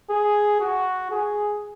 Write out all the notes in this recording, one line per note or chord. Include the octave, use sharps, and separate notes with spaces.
G#4
F#4
G#4